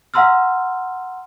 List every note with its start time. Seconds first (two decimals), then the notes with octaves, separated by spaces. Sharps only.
0.14 F5 F#5 A#5 C6 E6 F6